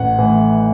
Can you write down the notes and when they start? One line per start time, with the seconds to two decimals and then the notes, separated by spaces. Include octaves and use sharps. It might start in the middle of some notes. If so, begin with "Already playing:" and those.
Already playing: A1 F#5
0.18 A2 E3